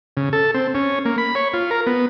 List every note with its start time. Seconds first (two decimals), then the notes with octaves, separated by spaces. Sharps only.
0.17 C#3
0.33 A4
0.54 C4
0.75 C#4
1.05 A#3
1.18 B5
1.35 C#5
1.53 F4
1.71 A#4
1.87 B3